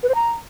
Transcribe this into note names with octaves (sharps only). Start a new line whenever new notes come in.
B4
C5
A#5